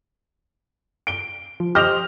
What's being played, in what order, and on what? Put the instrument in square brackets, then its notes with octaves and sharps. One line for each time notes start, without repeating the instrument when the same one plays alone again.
[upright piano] D7 G7
[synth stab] F3
[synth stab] G4 C5 D#5 [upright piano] F6 F7